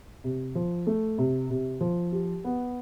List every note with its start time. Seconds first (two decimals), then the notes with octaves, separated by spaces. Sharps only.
0.24 C3
0.55 F3
0.87 A3
1.18 C3
1.50 C3
1.81 F3
2.12 G4
2.44 B3